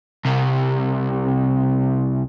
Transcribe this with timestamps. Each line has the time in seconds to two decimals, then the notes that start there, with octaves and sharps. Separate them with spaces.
0.25 C2 C3